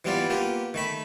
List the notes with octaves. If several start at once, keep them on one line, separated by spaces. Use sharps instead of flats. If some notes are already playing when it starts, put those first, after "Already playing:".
E3 G3 B3 F4 D5
A#3 B3 F4 G4
D#3 A3 B5